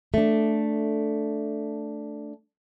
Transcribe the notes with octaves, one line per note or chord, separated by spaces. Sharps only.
A3 D4